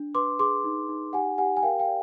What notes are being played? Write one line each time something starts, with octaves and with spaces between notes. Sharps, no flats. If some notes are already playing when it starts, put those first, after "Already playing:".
Already playing: D4
B4 C6 D6
G#4 C6 D6
D#4
D#4
G4 F#5 G#5
G4 F#5 G#5
G#5
A#4 F5 G5
F5 G5
D5